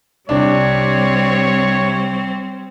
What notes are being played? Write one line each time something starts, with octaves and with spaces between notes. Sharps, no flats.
C2 G3 C4 D4 C#5